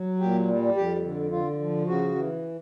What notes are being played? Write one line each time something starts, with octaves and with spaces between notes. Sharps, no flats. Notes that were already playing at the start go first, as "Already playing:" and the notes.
Already playing: F#3
A#2 G4
G3
F2 G4
D3
D3 F4
F3
C#3 F#4
E3